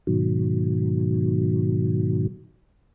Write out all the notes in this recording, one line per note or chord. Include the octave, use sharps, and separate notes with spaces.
G#2 B2 D#3 F#3